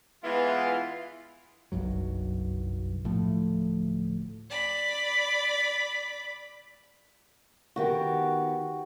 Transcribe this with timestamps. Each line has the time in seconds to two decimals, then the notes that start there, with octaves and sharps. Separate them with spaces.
0.24 E3 G#3 B3 E4 F4
1.72 F#1 B1 G2 F#3
3.04 D1 A2 F3 A3
4.50 D5 B5
7.76 D#3 B3 F#4 G4